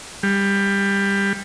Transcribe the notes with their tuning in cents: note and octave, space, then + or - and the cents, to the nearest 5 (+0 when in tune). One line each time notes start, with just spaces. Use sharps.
G3 +20